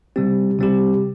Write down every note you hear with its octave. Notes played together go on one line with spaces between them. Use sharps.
C3 G3 C4 G4
C3 G3 C4 G4